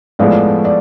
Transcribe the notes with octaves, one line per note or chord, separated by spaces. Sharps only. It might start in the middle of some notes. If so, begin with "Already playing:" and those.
A2 F3 G#3 B3 D5
D5